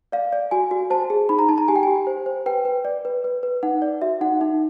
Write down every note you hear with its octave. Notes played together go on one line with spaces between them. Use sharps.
D5 F5
D5
F#4 G#5
F#4
C5 A5
G#4
D#4 B5
A#5
D#4 A5
A#5
G4 G#5
G5
G4 G#5
C5
C5
B4 G5
B4
D5
B4
B4
B4
D#4 F#5
D5
F#4 E5
D#4 F#5
D#4